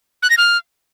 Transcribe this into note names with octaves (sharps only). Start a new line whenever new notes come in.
F#6
A#6
F6